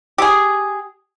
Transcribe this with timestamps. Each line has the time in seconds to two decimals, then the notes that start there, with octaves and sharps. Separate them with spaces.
0.18 G4 G#4